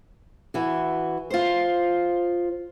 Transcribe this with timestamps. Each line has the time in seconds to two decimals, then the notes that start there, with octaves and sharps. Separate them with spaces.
0.54 E3 F#4
1.30 F4 C5